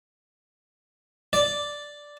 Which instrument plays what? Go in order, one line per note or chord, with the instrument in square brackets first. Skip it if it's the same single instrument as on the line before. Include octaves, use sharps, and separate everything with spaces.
[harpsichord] D5